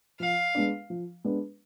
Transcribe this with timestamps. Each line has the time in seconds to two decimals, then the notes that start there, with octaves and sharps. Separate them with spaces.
0.20 F3 F5
0.55 G#3 B3 D4
0.90 F3
1.24 G#3 B3 D4